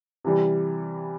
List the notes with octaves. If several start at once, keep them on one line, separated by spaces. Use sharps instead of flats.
C3 E3 G3